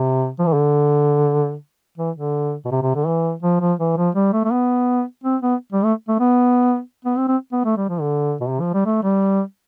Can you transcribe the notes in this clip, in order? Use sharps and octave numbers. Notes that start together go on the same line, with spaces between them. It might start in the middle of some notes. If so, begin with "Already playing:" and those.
Already playing: C3
F3
E3
D3
E3
D3
B2
C3
C3
D3
E3
F3
F3
E3
F3
G3
A3
A3
B3
C4
B3
G3
A3
A3
B3
B3
C4
C4
B3
A3
G3
F3
D3
B2
C3
F3
G3
A3
G3